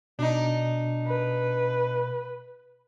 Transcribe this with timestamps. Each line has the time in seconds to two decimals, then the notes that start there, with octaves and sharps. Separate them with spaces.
0.19 B2 D4 D#4
1.07 B4